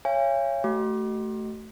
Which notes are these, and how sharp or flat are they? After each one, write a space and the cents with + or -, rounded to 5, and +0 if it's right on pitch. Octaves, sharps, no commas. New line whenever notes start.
C#5 +0 F5 -45 G#5 -35
A3 +0 F#4 +40